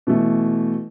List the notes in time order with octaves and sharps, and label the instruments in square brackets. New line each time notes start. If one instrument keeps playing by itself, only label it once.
[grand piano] B2 E3 A3